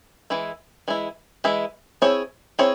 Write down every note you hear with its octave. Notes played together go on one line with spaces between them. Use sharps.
E3 G#3 E4
E3 G#3 E4
E3 G#3 E4
C4 E4 G#4 C#5
C4 E4 G#4 C#5